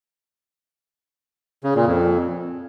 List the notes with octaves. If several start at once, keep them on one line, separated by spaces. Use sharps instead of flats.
C#3
A#2
F2